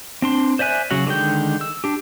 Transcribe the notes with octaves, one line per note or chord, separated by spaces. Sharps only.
C4 D4 C6
C5 D5 E5 G#5 F#6
C#3 F#3 F#4 F#5
D3 D#3 G#3 G5
E6
D4 G4